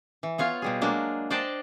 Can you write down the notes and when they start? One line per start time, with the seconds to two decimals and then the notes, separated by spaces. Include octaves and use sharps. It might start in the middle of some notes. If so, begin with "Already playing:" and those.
0.23 E3
0.38 B3 F4 C#5 F5
0.62 B2 G3 G#4
0.82 F#3 G#3 A#3 D4
1.30 D4 C5 D5 D#5 G5 A5